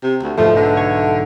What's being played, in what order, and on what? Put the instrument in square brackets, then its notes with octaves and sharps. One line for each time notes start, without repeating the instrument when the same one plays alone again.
[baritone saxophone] C3
D2
[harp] B1 G#2 [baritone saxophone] F3 [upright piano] A3
[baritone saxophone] D3
[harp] C#5